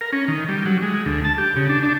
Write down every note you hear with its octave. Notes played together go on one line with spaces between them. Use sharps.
A#4
C#4
D#3
G3
F#3
G#3
D2
A5
G4
C#3
D4
D4